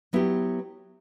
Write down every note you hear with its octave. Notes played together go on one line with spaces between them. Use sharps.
F#3 B3 E4 G4